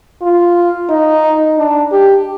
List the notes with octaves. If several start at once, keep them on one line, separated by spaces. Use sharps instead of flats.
F4
D#4
D4
G4